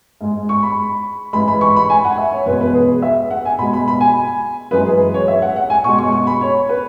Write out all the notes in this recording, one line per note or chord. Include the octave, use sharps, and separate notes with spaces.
G#2 G#3
C#6
B5
G#2 E3 G#3 B5
B5
C#6
B5
G#5
F#5
E5
C#5
E2 B2 G#3 B4
B4
G#4
E5
F#5
G#5
B2 G#3 B5
B5
B5
G#5
F#2 E3 G#3 B4
G#4
C#5
E5
F#5
F#5
G#5
B2 G#3 C#6
C#6
C#6
B5
C#5
B4